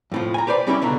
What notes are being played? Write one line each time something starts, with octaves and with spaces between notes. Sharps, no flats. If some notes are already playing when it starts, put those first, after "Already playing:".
F2 A2 F3
G#5 A#5
G4 B4 C5 D5
G3 C#4 D#4 E4 G4
C#2 B2 D3 A#5